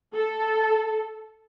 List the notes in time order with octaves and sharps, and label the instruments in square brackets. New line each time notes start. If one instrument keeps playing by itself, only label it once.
[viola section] A4